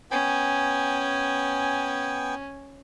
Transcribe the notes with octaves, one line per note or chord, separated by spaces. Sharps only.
B3 C#4 G5 G#5